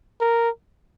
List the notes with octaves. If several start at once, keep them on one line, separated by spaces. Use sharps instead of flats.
A#4